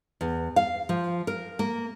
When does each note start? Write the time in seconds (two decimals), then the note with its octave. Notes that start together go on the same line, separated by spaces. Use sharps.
0.21 E2
0.56 F5
0.89 F3
1.27 A#4
1.59 A#3